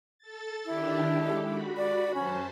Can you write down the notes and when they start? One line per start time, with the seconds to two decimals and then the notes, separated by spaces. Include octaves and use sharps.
0.19 A4 A6
0.65 D#3 D4 E4 G4
1.14 G#3 G4 A4
1.45 F#4 B5
1.77 D5
2.15 F#2 C#4 C5 A5